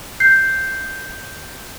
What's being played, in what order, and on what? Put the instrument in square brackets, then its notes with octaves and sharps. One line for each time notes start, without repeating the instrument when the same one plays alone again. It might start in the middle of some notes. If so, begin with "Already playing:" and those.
[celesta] G6 C7